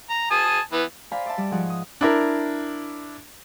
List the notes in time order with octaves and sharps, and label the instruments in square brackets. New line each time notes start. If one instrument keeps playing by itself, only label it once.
[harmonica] A#5
G#5 A5 D#6
E3 B3 B4
[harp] C5 D5 F5 G#5 A#5 B5
D5 E5 A5
G3 D5
G#2 F3 D#4 G#4 F#5
D#6
[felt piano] D4 E4 A#4